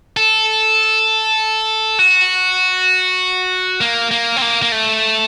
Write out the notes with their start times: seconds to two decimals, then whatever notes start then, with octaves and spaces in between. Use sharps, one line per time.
0.17 A4
1.99 F#4
3.81 A#3
4.11 A#3
4.36 C4
4.42 A#3
4.62 A#3
4.72 A3